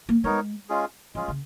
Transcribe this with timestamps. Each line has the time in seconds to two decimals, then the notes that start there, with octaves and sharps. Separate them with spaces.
0.09 A#3
0.24 G#3 B3 D#4 A#4 C#5
0.69 G#3 C#4 F4 G#4
1.15 F3 G#3 C#4 F4 G#4
1.28 C#3